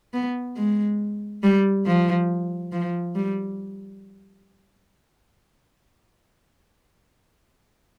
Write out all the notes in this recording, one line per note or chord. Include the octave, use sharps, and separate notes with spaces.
B3
G#3
G3
F3
F3
G3